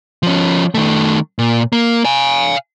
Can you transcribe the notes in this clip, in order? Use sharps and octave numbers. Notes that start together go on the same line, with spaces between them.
F3 C#4
D#3 A3
A#2
A#3
F5 G#5